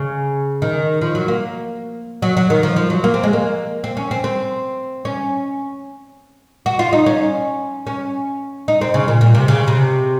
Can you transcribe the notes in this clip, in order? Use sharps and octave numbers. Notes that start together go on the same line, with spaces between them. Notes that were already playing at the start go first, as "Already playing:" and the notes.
Already playing: C#3
D#3
F3
F#3
A#3
F#3
F#3
D#3
F3
F3
F#3
A#3
C4
G#3
A#3
C4
C#4
C4
C4
C#4
F#4
F4
D#4
C#4
C#4
D#4
C4
C#3
A#2
A#2
C3
C#3
C3